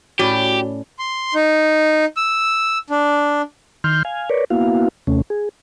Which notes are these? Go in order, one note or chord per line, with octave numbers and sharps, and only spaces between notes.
A2 C#4 F#4 G4 D5
C6
D#4
E6
D4
D#3 C6 F6 G6
F5 G#5
A#4 B4 C#5 D5
A#3 B3 E4 F#4 F5
D#2 C3 A3 C#4
G#4